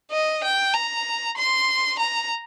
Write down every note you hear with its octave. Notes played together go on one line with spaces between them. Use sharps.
D#5
G5
A#5
C6
A#5